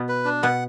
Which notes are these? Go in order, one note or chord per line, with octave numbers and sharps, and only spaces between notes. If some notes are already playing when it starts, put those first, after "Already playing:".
Already playing: B2 B3
B4
D4
B2 B3 F#5